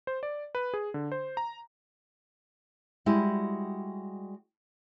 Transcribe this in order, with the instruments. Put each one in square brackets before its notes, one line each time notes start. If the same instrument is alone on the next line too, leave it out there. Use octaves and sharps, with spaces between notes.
[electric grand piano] C5
D5
B4
G#4
D3
C5
A#5
[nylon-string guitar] G3 G#3 E4 F#4 G4